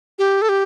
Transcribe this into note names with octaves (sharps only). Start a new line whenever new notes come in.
G4
A4
G4